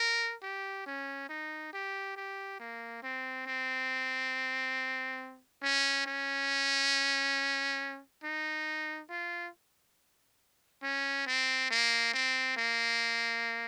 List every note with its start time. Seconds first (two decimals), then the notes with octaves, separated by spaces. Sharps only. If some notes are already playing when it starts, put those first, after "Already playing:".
Already playing: A#4
0.42 G4
0.86 C#4
1.29 D#4
1.73 G4
2.16 G4
2.60 A#3
3.03 C4
3.46 C4
5.63 C#4
6.06 C#4
8.24 D#4
9.10 F4
10.83 C#4
11.27 C4
11.71 A#3
12.14 C4
12.57 A#3